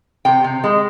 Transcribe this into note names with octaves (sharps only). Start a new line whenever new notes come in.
C3 G5
C3
G#3